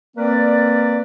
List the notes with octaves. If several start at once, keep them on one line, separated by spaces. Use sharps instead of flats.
A#3 C4 A#4 B4 D5